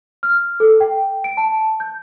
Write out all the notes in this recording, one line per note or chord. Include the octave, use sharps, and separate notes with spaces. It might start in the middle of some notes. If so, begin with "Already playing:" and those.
F6
A4
G5
D7
A5
G6